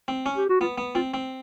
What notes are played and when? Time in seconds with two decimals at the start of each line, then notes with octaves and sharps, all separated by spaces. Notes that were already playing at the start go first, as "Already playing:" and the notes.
0.08 C4
0.26 C#4
0.37 G4
0.49 F#4
0.60 B3 F4
0.78 B3
0.95 C4 F4
1.14 C4